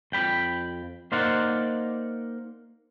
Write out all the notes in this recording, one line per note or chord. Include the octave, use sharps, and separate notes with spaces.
F2 G5 B5
A#3 D#4 C5 D5 F5 F#5